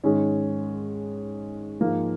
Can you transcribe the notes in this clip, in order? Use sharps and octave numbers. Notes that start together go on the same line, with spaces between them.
G#2 D#3 G#3 C#4
G#2 F3 G#3 A#3